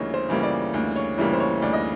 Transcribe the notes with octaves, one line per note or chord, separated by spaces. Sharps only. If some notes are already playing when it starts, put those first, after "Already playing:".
Already playing: D2 C#3 E3 G3 A#3 C#5 D#5
C5
C#3 E3 G3 A#3
D5
D2
C#5
C#3 E3 G3 A#3
C5
C#5
D2 D5
D#5